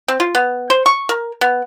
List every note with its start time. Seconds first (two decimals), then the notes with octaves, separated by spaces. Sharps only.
0.08 C4
0.20 F4
0.35 B3
0.70 C5
0.86 C#6
1.09 A#4
1.41 B3